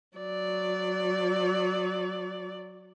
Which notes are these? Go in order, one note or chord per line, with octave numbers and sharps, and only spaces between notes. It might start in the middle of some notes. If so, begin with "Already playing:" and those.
F#3 D5